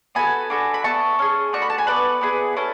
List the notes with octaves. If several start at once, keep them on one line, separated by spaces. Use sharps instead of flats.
B3 F#4 A4 G#5 B5
D4 F#4 A4
B5
B3 E4 A4 A5 C#6
C#4 G#4
A3 D4 F#4 C#6
B5
A5
G#5 B5
B3 D4 A4 B4 D5
B3 E4 G#4
C#4 E4 A4